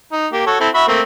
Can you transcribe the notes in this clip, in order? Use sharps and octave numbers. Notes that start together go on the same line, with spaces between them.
D#4
A#3 G4
F#4 A4 C#5
C4 E4 A4
F#4 E5 B5
A3 A#3 C4